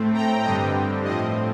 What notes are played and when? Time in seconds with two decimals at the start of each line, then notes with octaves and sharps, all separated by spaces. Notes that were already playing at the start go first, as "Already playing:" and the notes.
Already playing: A2 A3 C4
0.14 G5 A#5
0.44 G2 D3 G3 C4 D#5 G5
1.04 A2 F3 C4 D#5